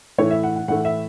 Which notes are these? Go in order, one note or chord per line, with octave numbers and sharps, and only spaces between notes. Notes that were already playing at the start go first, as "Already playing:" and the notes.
A2 E3 A3 C#5
E5
F#5
F#5
A2 E3 A3 F#5
E5